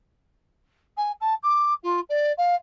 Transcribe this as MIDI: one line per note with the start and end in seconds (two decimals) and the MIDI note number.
0.97 1.11 80
1.20 1.34 81
1.43 1.73 86
1.83 2.00 65
2.09 2.32 74
2.37 2.55 77